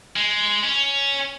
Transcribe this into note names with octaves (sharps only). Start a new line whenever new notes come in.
G#3
C#4